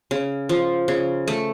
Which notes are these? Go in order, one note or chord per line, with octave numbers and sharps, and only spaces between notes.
C#3
F3
C#3
A3